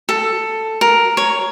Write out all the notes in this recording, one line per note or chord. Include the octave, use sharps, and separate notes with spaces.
A4
A#4
C#5